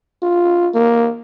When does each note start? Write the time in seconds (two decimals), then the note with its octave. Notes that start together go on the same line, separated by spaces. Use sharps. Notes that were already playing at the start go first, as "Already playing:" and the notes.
0.23 F4
0.74 A#3